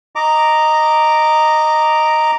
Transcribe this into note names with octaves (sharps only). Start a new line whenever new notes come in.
D#5 A#5 D6